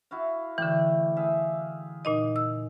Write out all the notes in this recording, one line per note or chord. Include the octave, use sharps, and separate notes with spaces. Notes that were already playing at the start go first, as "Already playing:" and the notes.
E4 F#4 F5
A2 D3 E3 G5 D6
G#4 E5 F5
A#2 D#4 D#5
E6